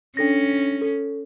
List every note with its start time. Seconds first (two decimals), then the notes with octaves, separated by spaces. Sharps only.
0.17 C#4 D4 A4 A#6
0.81 A4